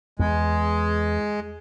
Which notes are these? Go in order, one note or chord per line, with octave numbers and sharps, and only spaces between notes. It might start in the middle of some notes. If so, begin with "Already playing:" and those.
E2 G#3